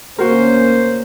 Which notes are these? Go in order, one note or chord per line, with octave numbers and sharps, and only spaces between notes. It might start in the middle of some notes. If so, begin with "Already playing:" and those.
D2 A#3 C#4 F#4 A#4 C5